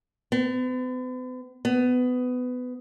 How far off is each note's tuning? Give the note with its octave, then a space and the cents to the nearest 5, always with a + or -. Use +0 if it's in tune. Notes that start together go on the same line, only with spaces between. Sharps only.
B3 +45
B3 +20